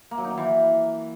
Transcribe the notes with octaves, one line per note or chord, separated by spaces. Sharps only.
A#3
F#3
D#4
D#3
E3